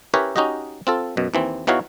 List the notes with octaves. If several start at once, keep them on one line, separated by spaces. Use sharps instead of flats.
C#4 E4 G4 A#4 B4 C#5
C#4 D#4 F#4 G4 D#5
C4 F4 A4
F#2 B2
D#2 E3 C4
E2 E3 D#4 F#4 C#5 F5